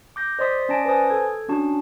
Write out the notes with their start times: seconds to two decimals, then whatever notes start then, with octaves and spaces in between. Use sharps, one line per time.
0.16 D6 G6 A#6
0.39 C5 D5 D#5 C6 D#6 B6
0.69 C#4 D5 G#5 A5 A#6 D7
0.85 B4 C5 G#5 A5 D#6 A6
1.10 A4 G#6
1.49 C#4 D4 F#4 A5